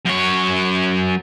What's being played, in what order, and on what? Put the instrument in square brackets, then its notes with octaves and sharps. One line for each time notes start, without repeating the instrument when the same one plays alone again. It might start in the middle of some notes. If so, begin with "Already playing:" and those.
[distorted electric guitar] F#2 C#5